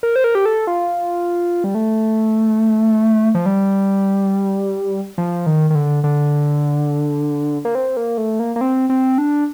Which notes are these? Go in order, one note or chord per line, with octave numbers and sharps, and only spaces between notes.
A#4
C5
A#4
G4
A4
F4
G3
A3
F3
G3
F3
D#3
D#3
D3
D3
A#3
C4
A#3
A3
A#3
A#3
C4
C4
D4